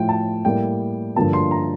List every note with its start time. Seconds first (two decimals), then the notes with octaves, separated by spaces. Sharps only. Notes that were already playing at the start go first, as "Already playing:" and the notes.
Already playing: A2 F3 A3 G5
0.09 A5
0.45 A2 G3 A#3 G5
1.16 G2 D3 F3 A#3 A5
1.33 C6
1.51 A#5